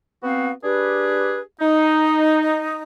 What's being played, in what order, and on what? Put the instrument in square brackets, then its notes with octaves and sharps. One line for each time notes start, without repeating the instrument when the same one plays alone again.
[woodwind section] B3 C4 F#4 F5
D4 G4 G#4 B4
D#4